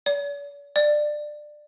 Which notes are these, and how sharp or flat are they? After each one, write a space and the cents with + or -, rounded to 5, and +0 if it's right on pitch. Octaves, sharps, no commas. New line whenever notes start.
D5 -45
D5 +20